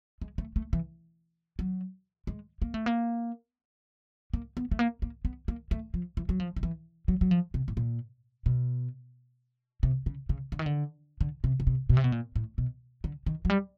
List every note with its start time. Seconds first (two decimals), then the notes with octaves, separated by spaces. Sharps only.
0.22 G#3
0.38 A3
0.56 A3
0.73 E3
1.59 F#3
2.27 G#3
2.62 A#3
2.74 A3
2.86 A#3
4.33 A#3
4.57 B3
4.71 A3
4.79 A#3
5.02 A#3
5.25 B3
5.48 A#3
5.71 A3
5.94 F3
6.17 E3
6.29 F#3
6.40 F3
6.56 D#3
6.63 E3
7.08 F#3
7.21 F#3
7.31 F3
7.54 C3
7.68 A2
7.77 A#2
8.46 B2
9.83 C3
10.06 C#3
10.29 C#3
10.52 D3
10.59 D#3
10.66 D3
11.21 D3
11.44 C3
11.60 C#3
11.67 C3
11.89 B2
11.97 C3
12.04 B2
12.12 A#2
12.36 A2
12.58 B2
13.04 D3
13.26 D#3
13.45 F#3
13.50 G3